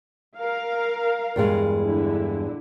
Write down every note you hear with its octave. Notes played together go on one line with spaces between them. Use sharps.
A#4 F5
E2 G2 G#3
D3 E4